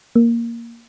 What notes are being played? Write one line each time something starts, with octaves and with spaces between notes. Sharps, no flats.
A#3